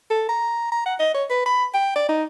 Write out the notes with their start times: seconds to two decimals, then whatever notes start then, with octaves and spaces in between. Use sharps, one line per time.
0.10 A4
0.29 A#5
0.72 A#5
0.86 F#5
0.99 D#5
1.14 C#5
1.30 B4
1.46 B5
1.74 G5
1.96 D5
2.09 D#4